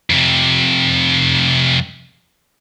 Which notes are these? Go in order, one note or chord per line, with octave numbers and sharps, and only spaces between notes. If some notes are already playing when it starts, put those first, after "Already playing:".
F2 C3